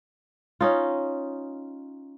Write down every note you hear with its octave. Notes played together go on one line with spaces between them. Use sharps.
C#4 D#4 F4